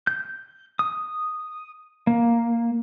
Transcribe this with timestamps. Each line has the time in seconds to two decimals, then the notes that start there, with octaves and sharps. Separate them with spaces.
0.07 G6
0.79 D#6
2.07 A#3